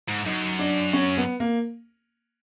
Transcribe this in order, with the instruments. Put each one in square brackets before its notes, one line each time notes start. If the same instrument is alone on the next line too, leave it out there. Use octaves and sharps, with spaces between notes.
[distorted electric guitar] G#2
[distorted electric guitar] F#2 [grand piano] D#4
[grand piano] D4
C#4
B3
A#3